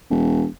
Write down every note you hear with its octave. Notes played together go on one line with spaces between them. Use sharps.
E1